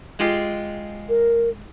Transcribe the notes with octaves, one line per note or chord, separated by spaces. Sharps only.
G#3 F4 G4
A#4